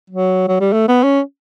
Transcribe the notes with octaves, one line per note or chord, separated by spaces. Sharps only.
F#3
F#3
G3
A3
B3
C#4